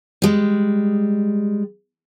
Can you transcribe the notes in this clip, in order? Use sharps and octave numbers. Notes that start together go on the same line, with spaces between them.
G3 G#3